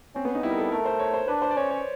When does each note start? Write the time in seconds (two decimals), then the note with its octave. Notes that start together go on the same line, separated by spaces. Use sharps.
0.15 C4 C#4
0.25 B3
0.35 D#4
0.43 G3 E4
0.51 A#4
0.58 A4
0.71 A3 A#4
0.85 C5
0.99 C#5
1.14 C5
1.28 D4 B4
1.42 C5
1.51 D5
1.56 C#4 C#5
1.70 C#5